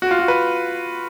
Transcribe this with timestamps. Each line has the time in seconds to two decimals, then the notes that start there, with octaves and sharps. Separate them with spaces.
0.02 F#4
0.11 F4
0.19 F#4
0.28 B4